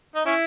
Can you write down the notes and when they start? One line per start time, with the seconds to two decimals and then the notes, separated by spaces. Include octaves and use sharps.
0.16 D#4
0.26 C#4 E4